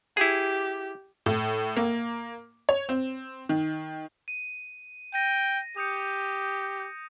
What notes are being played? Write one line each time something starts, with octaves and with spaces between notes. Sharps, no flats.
E4 G4 G#4
A2
A#3
C#5
C4
D#3
D#7
G5 A#6 D#7
G4 D#6 G6 C#7